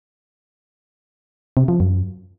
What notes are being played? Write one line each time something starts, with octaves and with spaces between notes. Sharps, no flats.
C3
F3
F#2